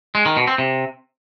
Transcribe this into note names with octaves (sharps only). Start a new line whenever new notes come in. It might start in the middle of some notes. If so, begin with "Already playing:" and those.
G#3
D#3
B2
C4
C3